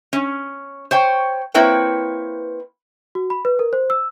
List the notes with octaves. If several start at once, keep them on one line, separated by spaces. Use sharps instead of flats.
C#4
C5 C#5 G5
A#3 C4 E4 B4 C#5 G5
F#4
B5
B4
A#4
C5
E6